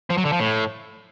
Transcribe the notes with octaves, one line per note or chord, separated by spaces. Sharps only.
F3
F#3
D3
F3
A2